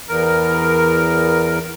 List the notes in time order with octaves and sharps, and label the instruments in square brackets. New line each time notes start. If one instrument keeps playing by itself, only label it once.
[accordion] E2 A#4